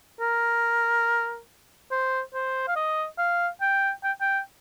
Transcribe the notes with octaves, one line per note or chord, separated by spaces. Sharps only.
A#4
C5
C5
F5
D#5
F5
G5
G5
G5